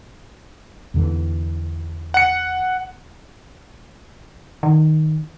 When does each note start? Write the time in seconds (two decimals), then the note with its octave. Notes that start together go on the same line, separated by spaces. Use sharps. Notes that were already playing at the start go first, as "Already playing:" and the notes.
0.94 E2 D3 E3
2.14 F#5 C#7
4.63 D#3